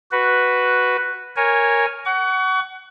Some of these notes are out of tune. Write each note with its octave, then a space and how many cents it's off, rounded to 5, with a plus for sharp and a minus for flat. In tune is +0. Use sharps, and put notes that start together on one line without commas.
F#4 +0 B4 +0
A#4 +0 C#5 +0 G#5 -10
F#5 +20 C#6 +35